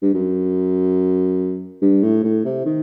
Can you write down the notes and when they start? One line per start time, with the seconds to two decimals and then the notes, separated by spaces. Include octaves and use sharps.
0.02 G2
0.14 F#2
1.82 G2
2.03 A2
2.24 A2
2.45 C3
2.66 D#3